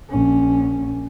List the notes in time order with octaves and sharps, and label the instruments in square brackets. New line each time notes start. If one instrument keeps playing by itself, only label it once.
[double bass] A#1 C#4